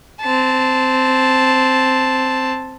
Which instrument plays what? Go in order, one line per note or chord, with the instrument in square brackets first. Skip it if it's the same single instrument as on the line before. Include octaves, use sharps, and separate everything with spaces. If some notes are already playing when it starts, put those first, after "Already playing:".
[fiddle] C4 A5